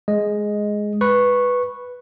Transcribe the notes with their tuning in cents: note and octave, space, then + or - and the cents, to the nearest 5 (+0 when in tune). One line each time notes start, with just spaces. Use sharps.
G#3 +5 D#5 +0
B4 +0 C#6 -10